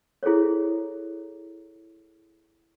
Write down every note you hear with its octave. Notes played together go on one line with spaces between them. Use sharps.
E4 G#4 A4 C5 C#5